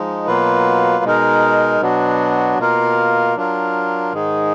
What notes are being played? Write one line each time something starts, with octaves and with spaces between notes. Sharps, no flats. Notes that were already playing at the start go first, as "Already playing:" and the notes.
Already playing: F3 G#3 D#4
B2 F#3 A#3 F4 B4
B2 G#3 D#4 A#4
B2 F#3 B3 D4 F#4
B2 A#3 F4 A#4
F#3 D4 F4 A#4
G#2 D#3 G#3 D#4 G#4